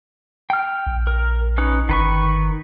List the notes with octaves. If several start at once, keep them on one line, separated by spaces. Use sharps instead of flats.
G5 F6
A#1
A#4
C#4 D#4 B4
G1 D#3 B4 C#6